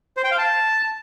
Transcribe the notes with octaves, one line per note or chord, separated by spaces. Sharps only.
C5
G5
F5
A5